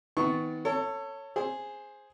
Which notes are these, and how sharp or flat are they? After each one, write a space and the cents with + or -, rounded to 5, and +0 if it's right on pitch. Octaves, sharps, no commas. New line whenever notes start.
D#3 +35 B3 +15 C#6 +0
A4 +25 C#5 +0
G#4 +0 C5 +10